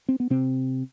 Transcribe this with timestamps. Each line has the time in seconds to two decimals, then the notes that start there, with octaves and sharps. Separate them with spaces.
0.09 C4
0.20 B3
0.30 C3 C4